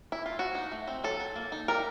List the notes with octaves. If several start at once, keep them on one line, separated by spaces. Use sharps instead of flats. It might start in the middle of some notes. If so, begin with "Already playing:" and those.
E4
F4
F3 F#4
D#4
A3
C4
F#3 A4
F#3
A#3
D#4
G3 A#4